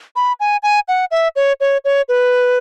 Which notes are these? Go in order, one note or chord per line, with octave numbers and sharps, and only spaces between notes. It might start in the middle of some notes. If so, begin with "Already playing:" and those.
B5
G#5
G#5
F#5
E5
C#5
C#5
C#5
B4